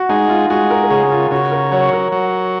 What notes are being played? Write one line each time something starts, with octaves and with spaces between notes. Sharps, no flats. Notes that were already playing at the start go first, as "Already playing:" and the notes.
Already playing: F#4
G#3 D#4
F4
G#3 F#4
A#4
A#4
C#3 G#4
F4
C#3 F#4
A#4
F#3 C#5
A#4
F#3